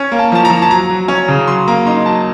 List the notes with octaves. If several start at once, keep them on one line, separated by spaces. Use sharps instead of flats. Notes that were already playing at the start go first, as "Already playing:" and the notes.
Already playing: C#4
A#3
A5
F3 A5
A#5
F3
A5
F#3 A#5
F#3
C#4
C#3
F#3 C6
A#3 A#5
D#4 C6
F#3 A5